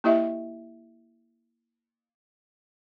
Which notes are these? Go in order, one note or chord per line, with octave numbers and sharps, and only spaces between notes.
A#3 E4 G4 D#5 E5